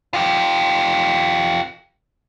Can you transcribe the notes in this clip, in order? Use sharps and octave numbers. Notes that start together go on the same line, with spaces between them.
F4 G4